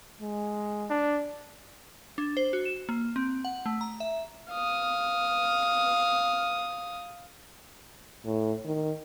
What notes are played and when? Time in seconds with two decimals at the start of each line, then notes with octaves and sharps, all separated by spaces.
0.21 G#3
0.90 D4
2.18 D4
2.37 C5
2.53 F#4
2.65 E7
2.89 A#3
3.16 C4
3.45 F#5
3.66 A3
3.81 A#5
4.00 E5
4.50 F5 D#6
8.25 A2
8.65 D#3